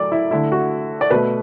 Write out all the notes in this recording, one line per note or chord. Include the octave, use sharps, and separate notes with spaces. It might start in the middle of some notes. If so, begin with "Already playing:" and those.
Already playing: A2 F#3 A3 D5 D6
E4
D3 A3 E4
F#4
D5
B2 A3 B4